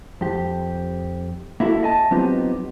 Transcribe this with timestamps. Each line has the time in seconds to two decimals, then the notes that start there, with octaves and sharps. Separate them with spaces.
0.21 F2 G4
1.60 A#3 E4 F#4 G4 A4
1.83 D#5 G#5 A5
2.11 F#3 B3 C4 D#4 F4 G4